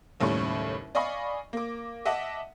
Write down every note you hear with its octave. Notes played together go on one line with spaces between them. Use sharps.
F#1 D#2 A2 G3 C#4 C#6
D5 D#5 F5 G#5 B5 C#6
A#3 D6
D#5 E5 F#5 A5 D6